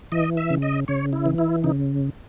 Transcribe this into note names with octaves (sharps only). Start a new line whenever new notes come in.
E3 D#5
E5
C#3
D#5
C#3 C#5
E4
E3
E4
C#3 D#4